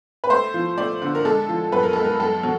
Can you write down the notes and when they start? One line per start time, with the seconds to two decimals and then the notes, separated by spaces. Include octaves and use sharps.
0.24 B4
0.30 A3 C5
0.54 F3
0.78 A3 D5
1.02 D3
1.15 A#4
1.25 G#3 A4
1.49 F3
1.72 F#2 B4
1.83 A#4
1.93 G#3 A4
2.04 A#4
2.20 F#2 A4
2.43 F#3